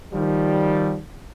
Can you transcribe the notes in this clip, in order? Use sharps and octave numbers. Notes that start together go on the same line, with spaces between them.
D#3 F3 G3